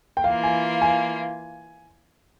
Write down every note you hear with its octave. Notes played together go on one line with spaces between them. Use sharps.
G5
E3 A#3 F4 F5
G#5
G#5